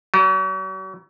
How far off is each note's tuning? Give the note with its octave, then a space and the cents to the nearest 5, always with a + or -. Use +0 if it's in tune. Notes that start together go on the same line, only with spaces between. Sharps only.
F#3 +40